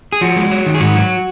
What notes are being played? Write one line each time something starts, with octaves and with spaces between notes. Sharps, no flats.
G#4
F3 F#4
G#3
F#3
D#3
G#4
G#2 F#4
F#3